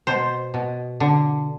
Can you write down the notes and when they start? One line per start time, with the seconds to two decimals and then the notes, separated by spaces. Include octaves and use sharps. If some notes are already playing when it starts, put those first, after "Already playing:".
0.07 B2 C5
0.54 B2
1.00 D3